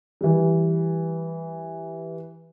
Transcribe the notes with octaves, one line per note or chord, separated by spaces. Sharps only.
E3 G3